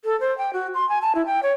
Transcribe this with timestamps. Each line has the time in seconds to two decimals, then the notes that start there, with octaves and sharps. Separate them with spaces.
0.05 A4
0.20 C5
0.38 G5
0.53 F#4
0.74 C6
0.89 G#5
1.02 A5
1.15 E4
1.26 G5
1.43 C#5